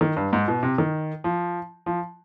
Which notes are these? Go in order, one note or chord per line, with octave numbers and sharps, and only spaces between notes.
D#3
G2
G#2
B2
C3
D#3
F3
F3